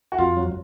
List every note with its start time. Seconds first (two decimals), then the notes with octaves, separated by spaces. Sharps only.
0.12 F#4
0.18 F2 F4
0.37 F#3